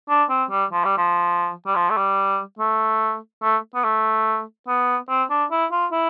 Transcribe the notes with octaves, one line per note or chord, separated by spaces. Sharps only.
D4
C4
G3
F3
G3
F3
G3
F3
A3
G3
A3
A3
B3
A3
B3
C4
D4
E4
F4
E4